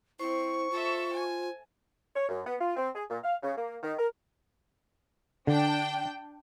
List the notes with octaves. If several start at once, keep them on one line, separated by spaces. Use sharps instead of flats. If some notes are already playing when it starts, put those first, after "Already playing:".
C4 E4 C5 C#6
F4 A4 E5
G#5
C#5
F#2
B3
F4
C4
G#4
A#2
F5
C#3
A#3
D#3
A#4
D3 D4 G5